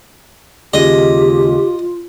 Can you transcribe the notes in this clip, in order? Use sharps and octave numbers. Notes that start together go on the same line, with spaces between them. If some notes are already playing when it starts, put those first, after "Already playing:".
D#2 C#3 G#3 F4 G4 D#5